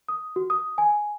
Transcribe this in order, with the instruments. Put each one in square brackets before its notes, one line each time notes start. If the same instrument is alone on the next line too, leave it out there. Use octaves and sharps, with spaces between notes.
[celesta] D#6
F#4
D#6
G#5